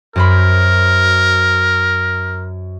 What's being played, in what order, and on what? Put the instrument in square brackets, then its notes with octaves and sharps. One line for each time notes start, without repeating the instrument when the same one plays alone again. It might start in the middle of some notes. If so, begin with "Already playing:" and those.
[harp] F#2 C5 B5 [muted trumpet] A#4